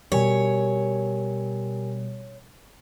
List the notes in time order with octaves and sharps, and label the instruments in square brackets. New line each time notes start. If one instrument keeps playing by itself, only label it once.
[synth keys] B2 G3 [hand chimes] G4 A#4 G#5 [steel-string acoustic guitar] C#5